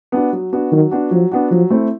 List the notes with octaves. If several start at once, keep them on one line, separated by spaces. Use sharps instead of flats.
B3 D4 F#4
F#3
B3 D4 F#4
D#3 F#3
B3 D4 F#4
F3 F#3
B3 D4 F#4
F3 F#3
A3 C4 E4